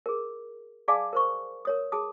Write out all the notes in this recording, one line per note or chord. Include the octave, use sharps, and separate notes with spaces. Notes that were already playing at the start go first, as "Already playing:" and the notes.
G#4 A#4
G#4 D5 F5 G#5 A5 D6
A#4 C5 C#6
A#4 C#5 D#6
G#4 A5 D#6